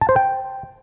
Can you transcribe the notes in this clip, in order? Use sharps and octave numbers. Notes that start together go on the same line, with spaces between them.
A5
C5
G5